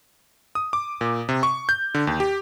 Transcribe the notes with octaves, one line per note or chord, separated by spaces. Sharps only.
D#6
D6
A#2
C3
C#6
G6
D3
D#2
G4